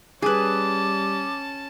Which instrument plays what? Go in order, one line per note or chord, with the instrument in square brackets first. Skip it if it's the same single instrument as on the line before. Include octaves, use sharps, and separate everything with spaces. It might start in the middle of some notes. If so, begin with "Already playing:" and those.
[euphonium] G3 [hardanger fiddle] C#4 A5 [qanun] G#4 B4 [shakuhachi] D6